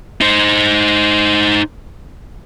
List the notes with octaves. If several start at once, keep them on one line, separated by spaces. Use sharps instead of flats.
D#4 C5